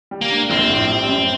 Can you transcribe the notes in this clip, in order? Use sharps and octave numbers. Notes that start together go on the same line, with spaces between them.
G3
A#3
D4
A#1 C4
A2
G3
F#2